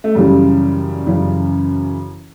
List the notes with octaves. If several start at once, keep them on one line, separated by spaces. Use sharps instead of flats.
A3
F#2 C#3 E3 G3
F#2 C#3 E3